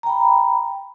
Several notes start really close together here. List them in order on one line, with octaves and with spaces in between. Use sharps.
A#5 G5 B5